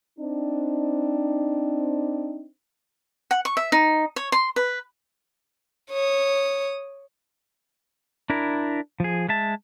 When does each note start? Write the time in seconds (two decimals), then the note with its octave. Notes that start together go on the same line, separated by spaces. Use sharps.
0.19 C4 D4 D#4
3.31 F#5
3.45 C#6
3.57 E5
3.72 D#4
4.16 C#5
4.32 C6
4.56 B4
5.91 C#5 D#6
8.30 D4 E4 A#4
9.00 F3 G#4
9.29 G#3 E5 A5